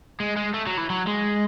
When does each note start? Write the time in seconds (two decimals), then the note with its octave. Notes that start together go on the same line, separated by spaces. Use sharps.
0.20 G#3
0.36 G#3
0.54 A3
0.67 F#3
0.78 E3
0.90 F#3
1.07 G#3